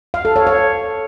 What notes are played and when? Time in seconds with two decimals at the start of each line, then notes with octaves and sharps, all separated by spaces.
0.14 F5
0.25 A4
0.36 C#5
0.47 C#5